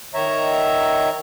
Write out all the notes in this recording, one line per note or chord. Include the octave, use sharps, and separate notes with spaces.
D#3 C#5 E5 A#5